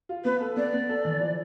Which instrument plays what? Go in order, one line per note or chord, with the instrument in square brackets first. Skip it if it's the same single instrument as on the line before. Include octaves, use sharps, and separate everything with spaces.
[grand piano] F4
[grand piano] B3 [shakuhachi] B4
[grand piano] A4
[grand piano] B3 [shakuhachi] D5
[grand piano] B3
A4
E3
F3